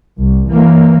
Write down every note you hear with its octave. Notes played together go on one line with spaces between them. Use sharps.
C2
E3 A#3